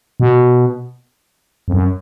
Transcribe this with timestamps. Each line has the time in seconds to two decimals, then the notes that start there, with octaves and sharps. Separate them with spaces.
0.20 B2
1.68 F2
1.73 F#2